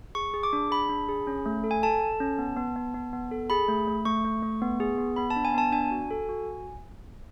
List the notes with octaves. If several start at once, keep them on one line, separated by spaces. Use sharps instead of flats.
G#4 C#6
G#4
D6
D4
G#4 B5
D4
G#4
C#4
A3
A4
G#5
A4 A5
A4
C#4
B3
B3
B3
B3
B3
A4
G#4 B5
A3
A3
A3 C#6
A3
A3
B3
G#4
B3
B3 B5
A5
D4
G#5
B3 A5
D4 G#5
F#4
A4
F#4